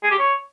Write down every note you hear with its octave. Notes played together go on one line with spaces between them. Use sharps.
G#4
G4
C#5